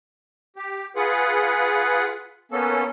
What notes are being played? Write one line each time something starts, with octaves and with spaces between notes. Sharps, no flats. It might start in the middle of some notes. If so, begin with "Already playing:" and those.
G4
F4 G#4 B4 F#5
A#3 B3 C#4 A4